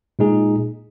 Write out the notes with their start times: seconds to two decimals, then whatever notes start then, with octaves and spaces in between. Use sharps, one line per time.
0.19 A#2 G#3 D#4 G#4